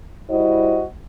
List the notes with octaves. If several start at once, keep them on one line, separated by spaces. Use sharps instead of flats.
G3 E4 F#4 C5 D#5